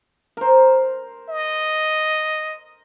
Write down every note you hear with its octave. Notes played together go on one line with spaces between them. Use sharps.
A#4 C5
D#5